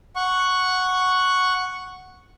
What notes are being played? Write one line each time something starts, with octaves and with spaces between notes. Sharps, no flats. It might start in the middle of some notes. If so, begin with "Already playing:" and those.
F#5 C#6